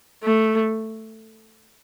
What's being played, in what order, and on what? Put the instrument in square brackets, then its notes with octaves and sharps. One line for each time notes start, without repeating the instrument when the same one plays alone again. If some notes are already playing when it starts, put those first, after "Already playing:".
[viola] A3